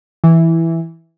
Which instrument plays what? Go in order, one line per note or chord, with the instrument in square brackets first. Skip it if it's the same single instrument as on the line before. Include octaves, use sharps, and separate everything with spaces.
[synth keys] E3